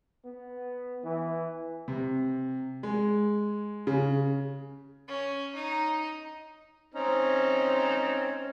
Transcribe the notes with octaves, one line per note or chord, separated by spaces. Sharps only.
B3
E3
C3
G#3
C#3
C#4
D#4
C4 C#4 D#4